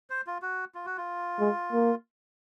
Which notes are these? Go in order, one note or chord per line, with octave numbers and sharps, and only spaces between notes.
C5
F4
F#4
F4
F#4
F4
G#3
A#3